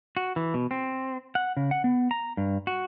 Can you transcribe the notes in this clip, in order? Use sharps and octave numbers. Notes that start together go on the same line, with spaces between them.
F#4
E3
B2
C4
F#5
C#3
F#5
B3
A#5
G2
F#4